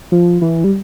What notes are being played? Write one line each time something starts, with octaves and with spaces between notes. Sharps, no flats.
F3
E3
G3